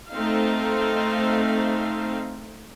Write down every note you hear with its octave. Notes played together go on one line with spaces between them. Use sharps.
A3 C4 D#4 F5